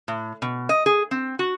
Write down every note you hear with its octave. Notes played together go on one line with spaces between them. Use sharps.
A2
B2
D#5
G#4
C4
F#4